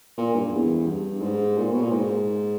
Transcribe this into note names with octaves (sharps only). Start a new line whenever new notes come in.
A#2
G2
G2
E2
G2
G#2
A#2
B2
A#2
G#2